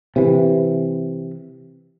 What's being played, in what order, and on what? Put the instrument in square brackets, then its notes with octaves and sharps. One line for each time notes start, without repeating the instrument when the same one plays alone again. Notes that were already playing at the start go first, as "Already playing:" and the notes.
[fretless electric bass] C3 E3